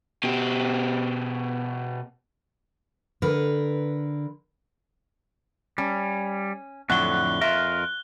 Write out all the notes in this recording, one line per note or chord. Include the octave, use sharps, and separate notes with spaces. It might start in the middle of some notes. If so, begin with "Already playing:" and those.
B2 G4
D3 A#4 B4
G3 C#4
F2 A2 D3 F#3 F#6 G7
F2 F4 A#4 E5